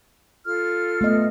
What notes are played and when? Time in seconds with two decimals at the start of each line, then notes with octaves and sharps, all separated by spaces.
0.45 F4 A4 F6
1.01 A3 B3 D#5